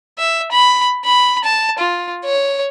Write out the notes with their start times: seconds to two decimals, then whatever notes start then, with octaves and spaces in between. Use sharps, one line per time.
0.18 E5
0.51 B5
1.05 B5
1.44 A5
1.78 F4
2.25 C#5